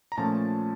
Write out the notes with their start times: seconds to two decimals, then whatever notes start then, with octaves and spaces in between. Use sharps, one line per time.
0.12 A#5
0.17 A#2 F3 A3 C#4 A5